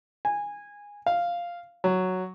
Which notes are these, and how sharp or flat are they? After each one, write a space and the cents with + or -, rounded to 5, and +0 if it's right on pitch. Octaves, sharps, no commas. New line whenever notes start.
G#5 -15
F5 -5
F#3 +0